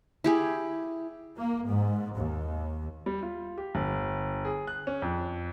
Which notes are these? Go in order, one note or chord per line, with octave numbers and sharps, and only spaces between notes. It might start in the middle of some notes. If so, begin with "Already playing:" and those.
E4 G4 G#4
A#3
G#2
D#2
G3
F4
G4
G1
G#4
F#6
C#4
F2